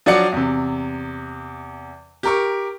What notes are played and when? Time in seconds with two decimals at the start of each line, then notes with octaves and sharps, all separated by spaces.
0.06 F3 F#3 D4 F#4 D5 C#7
0.32 E2 C3
2.23 G4 A#4 C#6